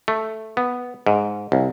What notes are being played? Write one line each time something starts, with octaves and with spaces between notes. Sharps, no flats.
A3
B3
G#2
C2